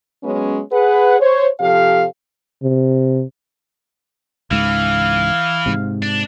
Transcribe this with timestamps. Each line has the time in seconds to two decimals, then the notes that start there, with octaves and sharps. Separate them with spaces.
0.24 F#3 G#3 B3 C#4
0.72 G#4 B4 F#5
1.20 C5 C#5
1.60 C3 F3 G4 A4 F5
2.63 C3
4.51 C#2 G#2 E3 F5
5.66 G#2 C3
6.02 D4